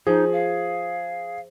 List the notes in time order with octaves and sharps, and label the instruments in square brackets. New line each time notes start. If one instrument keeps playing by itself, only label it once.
[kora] F3 [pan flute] D#4 [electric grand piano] G#4
[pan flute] F5